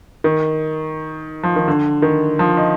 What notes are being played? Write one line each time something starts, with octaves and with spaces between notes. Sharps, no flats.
D#3
F3
D#3
D3
D#3
F3
D#4